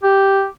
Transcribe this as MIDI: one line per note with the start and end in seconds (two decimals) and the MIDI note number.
0.03 0.46 67